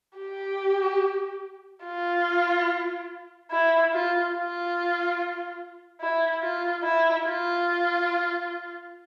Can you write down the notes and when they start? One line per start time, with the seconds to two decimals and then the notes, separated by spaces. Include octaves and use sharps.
0.18 G4
1.85 F4
3.51 E4
3.93 F4
4.35 F4
6.01 E4
6.42 F4
6.83 E4
7.25 F4